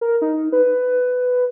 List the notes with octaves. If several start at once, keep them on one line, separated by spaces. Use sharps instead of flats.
A#4
D#4
B4